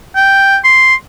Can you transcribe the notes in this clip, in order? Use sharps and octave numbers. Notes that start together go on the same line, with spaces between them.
G5
C6